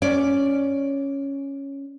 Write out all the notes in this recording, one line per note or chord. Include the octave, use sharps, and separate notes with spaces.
C#4 D5